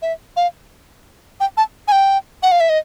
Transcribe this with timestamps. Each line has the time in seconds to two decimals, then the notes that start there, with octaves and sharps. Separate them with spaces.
0.02 E5
0.36 F5
1.40 G5
1.57 A5
1.88 G#5
1.92 G5
2.43 F#5
2.52 F5
2.60 E5
2.69 D#5